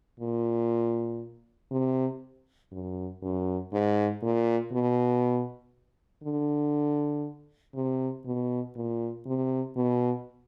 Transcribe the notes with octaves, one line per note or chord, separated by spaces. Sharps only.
A#2
C3
F#2
F#2
G#2
A#2
B2
D3
C3
B2
A#2
C3
B2